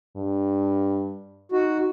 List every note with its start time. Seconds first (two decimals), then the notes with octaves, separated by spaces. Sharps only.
0.16 G2
1.52 D#4 F#4